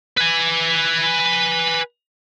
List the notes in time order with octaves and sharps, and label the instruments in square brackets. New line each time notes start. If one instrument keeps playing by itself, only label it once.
[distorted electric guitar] B4 G#5